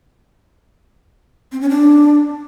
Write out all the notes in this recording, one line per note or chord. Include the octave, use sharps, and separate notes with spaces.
C4
C#4
D4